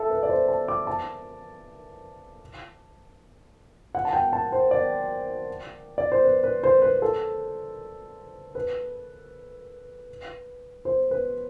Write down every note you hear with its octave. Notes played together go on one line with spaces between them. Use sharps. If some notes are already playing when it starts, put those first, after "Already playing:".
Already playing: A4 E5
B4
D5
C5
A5
D6
A5
F#5
A5
G5
A5
C5
D5
D5
C5
B4
B4
C5
B4
A4
B4
C5
B4